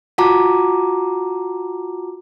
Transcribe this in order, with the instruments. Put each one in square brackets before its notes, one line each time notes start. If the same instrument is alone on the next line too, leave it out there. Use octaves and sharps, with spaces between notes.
[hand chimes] F4 F#4 F#5 A5 A#5 D6